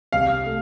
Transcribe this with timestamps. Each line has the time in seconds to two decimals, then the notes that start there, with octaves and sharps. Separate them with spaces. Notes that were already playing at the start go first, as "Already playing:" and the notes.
0.13 C2 F5
0.46 A3